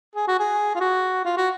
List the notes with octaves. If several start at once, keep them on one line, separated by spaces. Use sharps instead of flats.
G#4
F#4
G#4
F4
F#4
F4
F#4